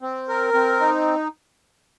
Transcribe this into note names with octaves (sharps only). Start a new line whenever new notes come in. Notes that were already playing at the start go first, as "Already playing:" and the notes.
C4
A#4
C4
D#4